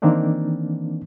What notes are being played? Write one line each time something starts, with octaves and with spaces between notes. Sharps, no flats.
D#3 E3 A#3 C4 D4 D#4